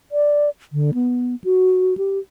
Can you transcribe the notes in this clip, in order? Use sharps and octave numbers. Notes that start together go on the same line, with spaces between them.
D5
D3
B3
F#4
G4